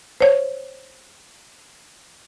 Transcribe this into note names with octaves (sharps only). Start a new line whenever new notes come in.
C5 C#5